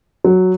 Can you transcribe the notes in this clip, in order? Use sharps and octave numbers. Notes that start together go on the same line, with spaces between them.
F#3